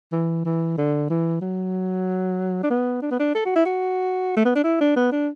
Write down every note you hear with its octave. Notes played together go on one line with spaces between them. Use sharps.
E3
E3
D3
E3
F#3
D4
B3
D4
B3
D4
A4
F#4
E4
F#4
A3
B3
D4
E4
D4
B3
D4